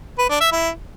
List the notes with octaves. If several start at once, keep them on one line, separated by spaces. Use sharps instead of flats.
B4
D4
E5
E4